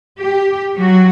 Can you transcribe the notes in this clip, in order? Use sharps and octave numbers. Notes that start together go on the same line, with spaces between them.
G4
F#3 F#4